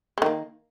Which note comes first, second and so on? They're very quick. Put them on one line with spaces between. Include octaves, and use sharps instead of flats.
G#3 D#3 A#3